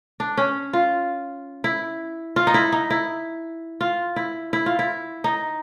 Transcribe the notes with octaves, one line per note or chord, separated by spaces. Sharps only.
D4
C#4
F4
E4
F4
D#4
E4
D#4
E4
F4
E4
E4
F4
E4
D#4